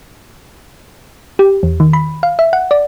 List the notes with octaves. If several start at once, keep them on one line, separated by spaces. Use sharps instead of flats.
G4
E2
D#3
B5
F5
E5
F#5
D5